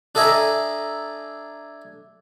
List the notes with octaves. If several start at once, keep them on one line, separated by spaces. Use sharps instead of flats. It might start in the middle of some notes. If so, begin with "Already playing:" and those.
D4 A4 D#5 E5 G#5 A#5